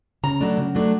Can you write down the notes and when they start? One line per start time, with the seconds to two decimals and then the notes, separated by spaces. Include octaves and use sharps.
0.23 C#3 A#5
0.41 F#3 A3 D4
0.58 C#3
0.75 F#3 A3 D4